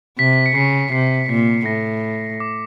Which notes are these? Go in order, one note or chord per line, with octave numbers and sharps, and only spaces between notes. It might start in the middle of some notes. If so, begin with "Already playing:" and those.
C3 B6
C#7
C#3 C7
C3 C7
A#2 B6
A2 A#6
D6